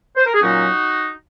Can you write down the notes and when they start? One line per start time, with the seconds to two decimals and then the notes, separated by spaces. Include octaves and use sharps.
0.17 C5
0.25 A#4
0.34 G#4
0.41 A#2 F#3 C#4 D#4 F#4